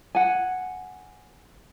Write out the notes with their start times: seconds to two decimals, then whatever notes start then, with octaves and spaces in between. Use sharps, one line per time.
0.15 F#5 G#5